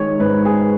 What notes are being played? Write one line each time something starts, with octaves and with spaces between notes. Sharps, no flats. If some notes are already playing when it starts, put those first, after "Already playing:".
Already playing: D#3 G#3 C#5
G#2 B4
B3 G#4